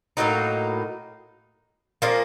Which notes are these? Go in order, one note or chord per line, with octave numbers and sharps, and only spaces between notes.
A2 F#3 A#3 D#4
A#2 F3 A#3